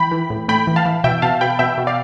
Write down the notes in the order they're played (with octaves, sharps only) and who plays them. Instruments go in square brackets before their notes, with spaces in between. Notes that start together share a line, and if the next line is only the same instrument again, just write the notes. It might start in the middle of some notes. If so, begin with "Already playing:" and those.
Already playing: [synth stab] E3 G5 B5
E3
A2
A2 G5 B5
E3
F5 A5
E3
B2 E5 G5
B2 F5 A5
B2 G5 B5
B2 E5 G5
B2
D5 F5